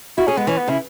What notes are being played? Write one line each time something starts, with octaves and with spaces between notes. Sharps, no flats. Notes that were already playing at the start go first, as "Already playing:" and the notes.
E4 F#4
C#4 G#4
G#3 B3
E3 C#4
B3
C#3 E4